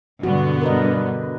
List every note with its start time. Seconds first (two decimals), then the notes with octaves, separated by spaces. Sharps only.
0.23 G2 B2 D3 B3 D4 F#4
0.61 A#4 B4 D#5